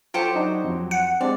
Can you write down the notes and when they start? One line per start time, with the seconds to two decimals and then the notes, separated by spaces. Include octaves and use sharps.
0.14 F#3 F4 G4 A4 C5 C#6
0.35 D4 D#4 F#4
0.64 F2
0.91 F#5
1.21 G#3 C4 D4 G4 D5